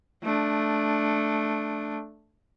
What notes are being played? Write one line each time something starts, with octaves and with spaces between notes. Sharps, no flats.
A3 D4